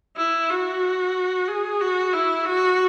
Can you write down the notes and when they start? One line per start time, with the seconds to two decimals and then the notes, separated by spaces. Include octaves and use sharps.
0.17 E4
0.50 F#4
1.48 G#4
1.80 F#4
2.13 E4
2.45 F#4